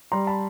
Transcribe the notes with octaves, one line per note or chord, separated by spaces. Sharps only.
G3 A#5 C6
A5 B5